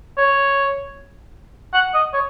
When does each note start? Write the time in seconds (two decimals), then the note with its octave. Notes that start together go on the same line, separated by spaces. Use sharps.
0.18 C#5
1.74 F#5
1.94 D#5
2.14 C#5